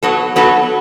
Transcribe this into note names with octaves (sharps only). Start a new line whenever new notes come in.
F#3 B3 F#4 A4
F#3 B3 F#4 A4